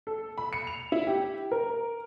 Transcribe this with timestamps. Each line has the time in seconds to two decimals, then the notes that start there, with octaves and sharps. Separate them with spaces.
0.07 A4
0.38 B5
0.53 C#7
0.67 F7
0.92 E4
1.07 G4
1.51 A#4